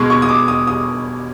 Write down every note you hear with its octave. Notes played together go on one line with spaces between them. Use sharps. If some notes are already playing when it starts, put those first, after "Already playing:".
Already playing: B2 G#3 C#6
C#6
D#6
D6
D#6
D#6